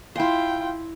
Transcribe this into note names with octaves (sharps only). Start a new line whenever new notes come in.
E4 F4 G5 C6